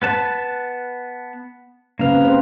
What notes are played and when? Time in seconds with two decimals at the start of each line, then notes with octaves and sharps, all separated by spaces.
0.02 B3 B4 A5
1.99 C#3 A#3 C4 B4 F5
2.20 C4 C5